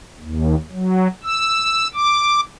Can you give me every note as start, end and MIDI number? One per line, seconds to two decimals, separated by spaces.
0.20 0.55 39
0.72 1.08 54
1.24 1.88 88
1.94 2.40 86